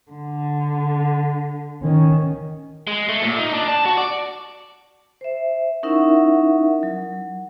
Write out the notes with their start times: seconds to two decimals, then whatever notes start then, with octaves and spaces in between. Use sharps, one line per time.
0.12 D3
1.81 D#3 C#4
2.87 G#3
3.09 A3
3.22 A#2
3.39 D#4
3.54 D4
3.68 A5
3.86 F#4
3.97 D5
5.21 C5 E5
5.83 C#4 D#4 E4 A#4 E5 F#5
6.83 F#3